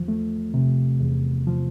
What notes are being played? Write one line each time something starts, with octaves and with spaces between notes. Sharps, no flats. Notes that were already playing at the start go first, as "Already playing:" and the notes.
Already playing: E2 F3
A3
C3
E2
F3